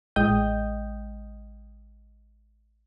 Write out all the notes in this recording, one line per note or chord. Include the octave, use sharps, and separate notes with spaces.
A1 G#3 D#5 G5 D#6 G6